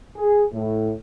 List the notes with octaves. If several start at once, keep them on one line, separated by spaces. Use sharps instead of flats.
G#4
A2